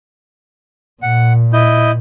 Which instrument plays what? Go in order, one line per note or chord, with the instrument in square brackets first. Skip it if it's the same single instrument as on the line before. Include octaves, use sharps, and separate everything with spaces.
[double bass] A#2 [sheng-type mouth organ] F#5
[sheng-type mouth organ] E4 D#5 G6